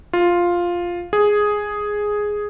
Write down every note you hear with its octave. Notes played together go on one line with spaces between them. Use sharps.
F4
G#4